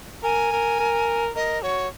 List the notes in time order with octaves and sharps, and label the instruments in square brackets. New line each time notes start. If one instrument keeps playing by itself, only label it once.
[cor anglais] A#4 [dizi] G#5
[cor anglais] A#4
A#4
[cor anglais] A#4 [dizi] D#5
[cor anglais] F#4 [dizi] C#5